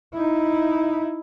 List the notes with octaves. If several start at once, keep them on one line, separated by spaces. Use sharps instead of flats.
D#4 E4